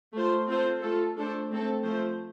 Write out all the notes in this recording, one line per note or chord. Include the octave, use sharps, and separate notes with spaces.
A3 F4 C5
C4 F4 A4 C5
A3 F4 A4
A3 D4 A4 C5
A3 C4 A4
F3 A3 F4 C5